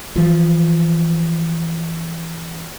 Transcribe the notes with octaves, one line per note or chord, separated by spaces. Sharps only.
E3 F3